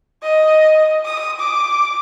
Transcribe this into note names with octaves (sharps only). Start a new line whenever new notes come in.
D#5
D#6
D6